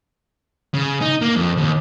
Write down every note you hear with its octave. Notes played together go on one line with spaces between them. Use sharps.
C#3
D#4
A#3
F2
D#2